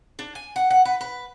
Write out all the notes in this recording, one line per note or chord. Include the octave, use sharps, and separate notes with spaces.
D4
G#5
F#5
F#5
B4
B4